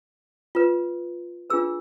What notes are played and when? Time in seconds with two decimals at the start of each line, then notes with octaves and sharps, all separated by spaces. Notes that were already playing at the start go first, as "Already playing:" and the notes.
0.55 F4 B4
1.50 D4 F4 G#4 B4 E6